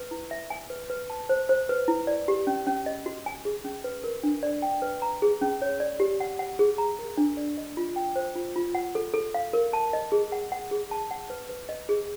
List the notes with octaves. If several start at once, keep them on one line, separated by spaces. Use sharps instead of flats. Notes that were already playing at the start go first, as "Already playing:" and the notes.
Already playing: B4
E4
E5
G#5
B4
B4
A5
C5
C5
B4
E4
D5
G4
C#4
C#4
D#5
F#4
G#5
G#4
C#4
B4
A#4
D4
D5
G5
B4
A#5
G#4
C#4
C#5
D5
G4
F#5
F#5
G#4
A#5
A#4
D4
D5
D#5
F4
G5
C5
F4
F4
F#5
A4
A4
F5
A#4
A5
D#5
G#4
F#5
F#5
G#4
A5
F#5
B4
B4
D#5
G#4